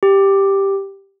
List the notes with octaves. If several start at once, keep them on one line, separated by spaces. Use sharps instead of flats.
G4